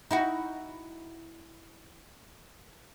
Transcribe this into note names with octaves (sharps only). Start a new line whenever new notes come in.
D#4 E4 F#4